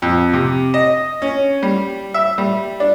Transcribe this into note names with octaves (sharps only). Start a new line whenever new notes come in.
F2
C3
D#5
C#4
G3
E5
G3
D4